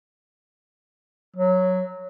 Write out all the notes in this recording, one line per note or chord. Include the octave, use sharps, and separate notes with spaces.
F#3